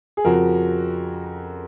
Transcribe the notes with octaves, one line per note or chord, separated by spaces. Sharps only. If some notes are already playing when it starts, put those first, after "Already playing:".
G#4
F2 C#3 F3 F#4 A#4